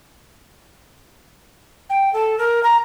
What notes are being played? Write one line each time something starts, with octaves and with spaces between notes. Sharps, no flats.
G5
A4
A#4
A#5